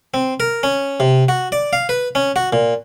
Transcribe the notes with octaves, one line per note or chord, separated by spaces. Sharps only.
C4
A#4
C#4
C3
F#4
D5
F5
B4
C#4
F#4
A#2